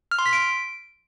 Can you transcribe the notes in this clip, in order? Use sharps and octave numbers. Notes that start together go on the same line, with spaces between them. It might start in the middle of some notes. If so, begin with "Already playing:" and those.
F6
C6
B6
D7